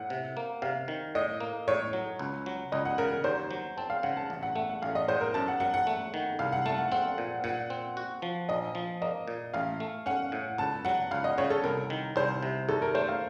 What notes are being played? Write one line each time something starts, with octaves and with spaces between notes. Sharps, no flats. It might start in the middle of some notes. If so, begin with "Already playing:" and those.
Already playing: A2 F#5
C3
A#3
C3 F5
D#3
A2 D#5
A#3
A2 C#5
F#3
C#2
F#3
C#2 D#5
F#5
C#3 A#4
A#4
D#2 C5
F#3
C4 A5
F5
C#3 F#5
A5
A1
F#5
A3 F#5
F#5
A1 F5
D#5
A2 C5
A#4
F#2 A5
F#5
F#3 F#5
F#5
A3
D#3
C2 F5
F#5
A3 A5
F#5
C4 F#5
A#2
A#2 F#5
C4
F#4
F3
A#1 D#5
F3
A#3 D#5
A#2
A1 F5
A3
C#4 F#5
A2
C#2 A5
F#3 F#5
C#2 F5
D#5
C#3 C#5
A4
C2 A#4
D#3
C2 C5
C3
D#2 A4
A#4
A3 C5
F5